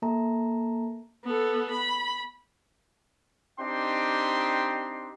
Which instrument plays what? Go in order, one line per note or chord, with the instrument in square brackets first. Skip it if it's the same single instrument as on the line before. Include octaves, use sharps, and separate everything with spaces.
[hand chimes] A#3 A4 A5 A#5
[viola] B3 A4
B5
[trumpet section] C4 D4 D#4 G4 G5 C6